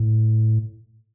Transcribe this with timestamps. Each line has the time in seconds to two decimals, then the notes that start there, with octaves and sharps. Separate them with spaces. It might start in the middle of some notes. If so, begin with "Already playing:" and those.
Already playing: A2